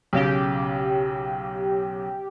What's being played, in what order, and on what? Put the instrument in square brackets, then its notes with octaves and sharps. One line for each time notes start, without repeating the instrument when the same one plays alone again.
[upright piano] B1 C#3 [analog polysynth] G4